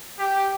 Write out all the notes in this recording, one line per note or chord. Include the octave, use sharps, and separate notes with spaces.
G4